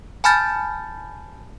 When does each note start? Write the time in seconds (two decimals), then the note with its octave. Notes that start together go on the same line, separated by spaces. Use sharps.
0.24 G#5 A5 B5 F6 G6 A6